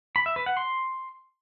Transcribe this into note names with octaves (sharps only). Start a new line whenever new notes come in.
B5
E5
B4
F#5
C6